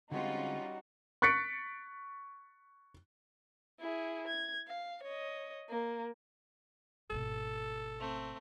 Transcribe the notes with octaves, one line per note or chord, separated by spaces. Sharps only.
D3 G3 G#3 C4 C#4 D#4 F4 F#4
C#6 F#6 A6 B6 C#7 D7
E4 G#4
G#6
F5
C#5 D#5
A#3
G#1 B2 A4
A3 C4